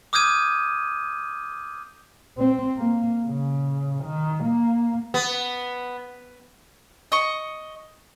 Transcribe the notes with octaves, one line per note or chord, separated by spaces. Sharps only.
D6 D#6 F6 G6 G#6 D#7
C4
A#3
C#3
D#3
A#3
B3
D#5 C#6